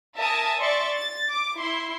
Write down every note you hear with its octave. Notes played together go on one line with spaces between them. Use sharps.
A#4 E5 G#5 A5 D#6
D5 E5 C6 C#6 A6
A6
D6
E4 C6